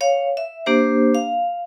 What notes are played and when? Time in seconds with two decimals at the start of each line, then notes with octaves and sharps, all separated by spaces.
0.01 C#5 F5
0.37 E5
0.66 A#3 D4 G4 C5
1.15 F5